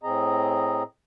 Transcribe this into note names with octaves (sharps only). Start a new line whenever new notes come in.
A2 C4 G#4 D#5 A#5